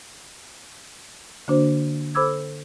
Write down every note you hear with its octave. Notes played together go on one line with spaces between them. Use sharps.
D3 A#3 D4 F#4 C5
A4 C5 B5 D6 E6 G#6